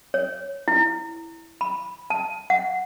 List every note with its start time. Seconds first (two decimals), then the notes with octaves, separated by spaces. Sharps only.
0.14 C#5
0.68 E4
1.61 B5
2.10 A5
2.50 F#5